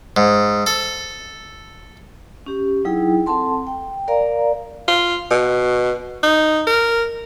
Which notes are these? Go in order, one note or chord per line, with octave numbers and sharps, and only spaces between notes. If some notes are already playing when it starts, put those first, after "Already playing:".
G#2
A4
C#4 G4
F#3 D#4 E4 G#4 G5
C4 A4 F#5 A5 C6
G5
A#4 D5 F5 A#5
F4
B2
D#4
A#4